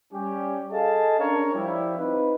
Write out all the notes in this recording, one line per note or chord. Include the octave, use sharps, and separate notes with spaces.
G3 C#4 G4
G#4 A4 D#5 F5 G#5 A5
C#4 D4 A#4 C#5
F3 G3 E4
C4 D#4 F4 B4